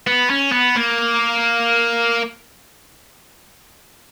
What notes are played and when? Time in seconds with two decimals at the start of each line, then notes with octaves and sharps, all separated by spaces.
0.07 B3
0.30 C#4
0.52 B3
0.76 A#3